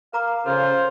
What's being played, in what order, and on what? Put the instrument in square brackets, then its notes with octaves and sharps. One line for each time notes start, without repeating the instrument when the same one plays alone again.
[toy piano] A#4 A#5 D6 [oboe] F5
[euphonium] C#3 [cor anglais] F4 [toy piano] A4 [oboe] C5